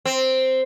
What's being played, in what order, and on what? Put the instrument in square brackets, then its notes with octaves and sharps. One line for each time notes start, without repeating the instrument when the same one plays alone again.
[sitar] C4